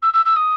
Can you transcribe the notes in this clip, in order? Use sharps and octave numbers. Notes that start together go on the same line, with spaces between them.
E6
E6
E6
D#6